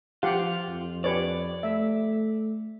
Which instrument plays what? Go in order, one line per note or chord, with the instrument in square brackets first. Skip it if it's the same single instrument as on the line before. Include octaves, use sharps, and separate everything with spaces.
[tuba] F3 [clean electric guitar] F4 [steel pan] G4 F5 F#5
[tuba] F2
[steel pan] G4 B4 C#5 [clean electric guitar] D5
[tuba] A3 [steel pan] E5